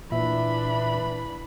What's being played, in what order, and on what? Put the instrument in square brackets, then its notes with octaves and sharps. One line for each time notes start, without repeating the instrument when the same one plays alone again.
[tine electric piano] A#2 E5 [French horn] E3 [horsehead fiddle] D4 B5